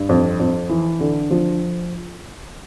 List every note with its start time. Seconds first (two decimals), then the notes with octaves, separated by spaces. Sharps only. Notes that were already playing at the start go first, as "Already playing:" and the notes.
Already playing: G2
0.09 F2
0.40 F2
0.69 E3
1.00 D3
1.31 F3